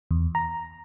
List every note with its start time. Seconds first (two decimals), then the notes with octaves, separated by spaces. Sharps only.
0.11 E2
0.35 A#5